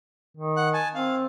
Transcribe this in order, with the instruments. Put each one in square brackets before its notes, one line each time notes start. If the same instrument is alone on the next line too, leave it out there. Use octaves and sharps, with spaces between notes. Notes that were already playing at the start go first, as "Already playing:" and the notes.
[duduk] D#3
[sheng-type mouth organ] F#5 F#6
G#5 A5
[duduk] C4 [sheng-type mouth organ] F5